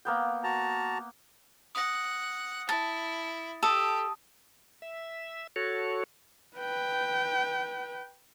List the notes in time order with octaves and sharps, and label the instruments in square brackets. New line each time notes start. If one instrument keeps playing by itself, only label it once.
[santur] A#3 B3 G5
[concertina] F#4 A5 A#5
[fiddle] F#5 [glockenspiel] D#6 A#6
[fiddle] E4 [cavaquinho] A5 [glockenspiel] A6
[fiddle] G4 [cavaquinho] A4 [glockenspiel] A5 D#6 E6
[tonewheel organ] E5
F#4 A4 C#5
[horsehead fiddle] B4 G5